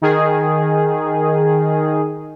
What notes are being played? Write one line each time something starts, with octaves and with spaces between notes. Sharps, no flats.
D#3 G#4